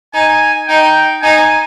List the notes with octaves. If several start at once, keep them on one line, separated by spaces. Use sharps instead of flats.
D#4 G#5
D#4 G5
D#4 G#5